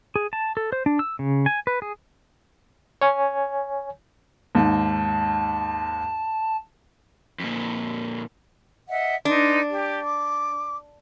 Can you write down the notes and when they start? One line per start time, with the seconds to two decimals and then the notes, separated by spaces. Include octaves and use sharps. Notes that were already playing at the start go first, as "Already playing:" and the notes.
0.16 G#4
0.33 A5
0.57 A4
0.72 C5
0.86 D4
0.99 E6
1.19 C#3
1.46 G#5
1.67 B4
1.82 G#4
3.01 C#5 G#5
4.55 D#2 G#2 A5
7.40 F2 A#2
8.88 D#5 E5 F#5
9.25 D4 D#4 B4 C6
9.70 G4
10.01 D6